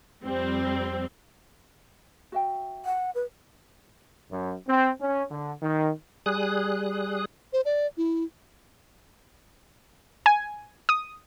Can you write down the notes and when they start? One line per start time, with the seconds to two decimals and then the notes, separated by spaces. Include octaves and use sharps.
0.23 F2 G3 C4
2.32 F#4 E5 G5
2.85 F#5
3.15 B4
4.31 F#2
4.68 C4
5.01 C#4
5.30 D3
5.63 D#3
6.26 G3 G#4 D#6 F#6
7.53 C5
7.65 D5
7.97 E4
10.26 G#5
10.89 D#6